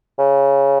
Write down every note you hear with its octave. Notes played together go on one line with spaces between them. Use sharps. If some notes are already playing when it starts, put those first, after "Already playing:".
C#3